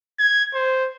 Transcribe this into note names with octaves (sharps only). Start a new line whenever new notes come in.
G#6
C5